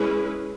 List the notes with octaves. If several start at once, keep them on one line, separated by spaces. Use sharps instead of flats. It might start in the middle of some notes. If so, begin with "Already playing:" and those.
Already playing: G#3 C#4 E4 G#4 B4